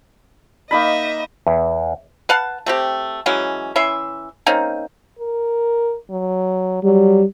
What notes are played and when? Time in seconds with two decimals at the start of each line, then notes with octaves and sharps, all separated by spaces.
0.71 A#3 D#4 D#5 E5 B5
1.47 E2
2.29 B4 F5 F#5 A5
2.66 A3 C4 G4
3.26 E3 F#3 G#3 C#4
3.76 E3 C#4 E5 C6
4.46 A#3 C4 C#4 D#4
5.19 A#4
6.10 F#3
6.84 F#3 G3